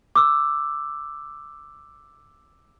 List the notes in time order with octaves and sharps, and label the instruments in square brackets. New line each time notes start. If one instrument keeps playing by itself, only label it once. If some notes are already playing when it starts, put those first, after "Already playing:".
[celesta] D6 E6